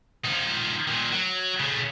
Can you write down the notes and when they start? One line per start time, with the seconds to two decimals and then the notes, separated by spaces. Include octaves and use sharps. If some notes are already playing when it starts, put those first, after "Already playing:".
0.25 F3 D#4
0.88 A#2 D#3
1.12 F#3
1.60 C#3 A3